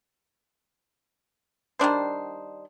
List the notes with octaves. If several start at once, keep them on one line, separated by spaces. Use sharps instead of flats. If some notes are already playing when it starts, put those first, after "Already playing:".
D#3 G3 D4 C5